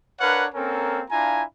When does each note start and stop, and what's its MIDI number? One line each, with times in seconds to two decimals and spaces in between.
0.20 0.45 62
0.20 0.45 70
0.20 0.45 71
0.20 0.45 73
0.20 0.45 77
0.20 0.45 78
0.54 1.02 58
0.54 1.02 60
0.54 1.02 61
0.54 1.02 69
0.54 1.02 70
1.10 1.43 62
1.10 1.43 64
1.10 1.43 65
1.10 1.43 77
1.10 1.43 80
1.10 1.43 82